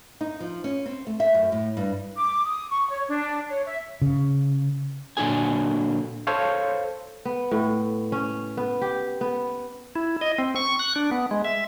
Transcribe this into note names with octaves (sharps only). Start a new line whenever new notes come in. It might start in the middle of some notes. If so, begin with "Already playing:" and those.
D#4
F3
C#4
C4
A3
E5
F#2
A2
G2
D6
D#6
C#6
C#5
D4
C#5
E5
C#3
A#2 D3 F#3 D4 G#4 G#5
A4 C5 C#5 F5
B3
A2
C#4
B3
G4
B3
E4
D#5
C4
C#6
F#6
D4
B3
G#3
E5